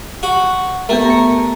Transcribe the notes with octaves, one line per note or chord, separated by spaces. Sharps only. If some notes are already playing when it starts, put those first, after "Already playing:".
F#4
A3 B3 G4 A#4
A#5 C#7